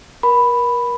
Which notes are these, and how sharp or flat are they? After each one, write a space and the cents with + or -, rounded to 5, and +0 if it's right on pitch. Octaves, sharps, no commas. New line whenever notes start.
A#4 +30 B5 +0